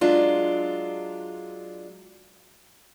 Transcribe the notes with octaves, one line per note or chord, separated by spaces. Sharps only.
F#3 G#3 D4 F4